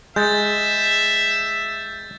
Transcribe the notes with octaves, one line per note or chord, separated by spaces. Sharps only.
G#3 E5 G6 A6